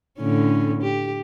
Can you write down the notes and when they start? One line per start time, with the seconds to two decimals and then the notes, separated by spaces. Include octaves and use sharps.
0.19 A2 D3 C#4
0.82 G4